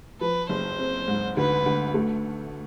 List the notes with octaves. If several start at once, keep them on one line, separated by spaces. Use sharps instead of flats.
F3 B4
F#1 C5
C4
G#2
D2 B4
D2
A3